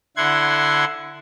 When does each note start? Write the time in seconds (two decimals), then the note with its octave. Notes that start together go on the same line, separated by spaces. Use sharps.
0.17 D3 E4 F#5 C6 G#6